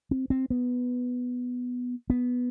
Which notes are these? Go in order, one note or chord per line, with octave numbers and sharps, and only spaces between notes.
C4
C4
B3
B3